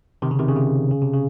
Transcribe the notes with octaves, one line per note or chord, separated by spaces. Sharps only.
C3 D#3
C#3
C3 D#3
C#3
C3
C#3
C3
C#3